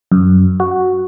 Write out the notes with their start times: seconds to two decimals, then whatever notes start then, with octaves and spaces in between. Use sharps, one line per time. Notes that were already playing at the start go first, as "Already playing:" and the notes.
0.12 F#2
0.60 F#4